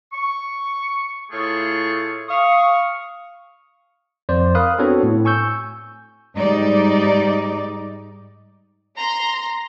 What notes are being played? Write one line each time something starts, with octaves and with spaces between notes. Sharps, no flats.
C#6
A2 A3 F4 G#4 C#6
F5 C#6 D#6
F2 C5 D5
A#4 F5 B5 D#6 F#6
B3 C4 D4 F#4 A4 C#5
A2
G#5 C#6 E6 G6
G#2 G3 D#4 D5
A#5 C6